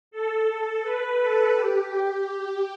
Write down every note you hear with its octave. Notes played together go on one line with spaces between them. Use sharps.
A4
B4
A4
G4
G4